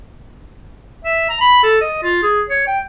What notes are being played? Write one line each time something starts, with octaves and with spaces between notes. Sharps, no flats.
E5
A#5
B5
A4
D#5
F4
G#4
C#5
G5